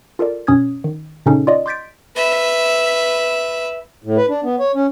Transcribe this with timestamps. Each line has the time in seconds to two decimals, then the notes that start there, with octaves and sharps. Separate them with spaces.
0.19 F4 A4 A#4 D5
0.47 F#2 B2 C#4 D#6 G#6
0.84 D#3
1.26 A#2 C#3 C#4 D#4 G#4 A4
1.47 F4 D5 D#5
1.66 C6 D6 G6 A6 B6 D7
2.16 B4 E5
4.04 A2
4.17 B4
4.29 D4
4.44 B3
4.60 C#5
4.75 C#4